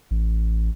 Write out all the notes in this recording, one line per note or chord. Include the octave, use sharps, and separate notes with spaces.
A1